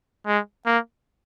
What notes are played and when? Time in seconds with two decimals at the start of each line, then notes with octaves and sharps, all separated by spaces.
0.27 G#3
0.66 A#3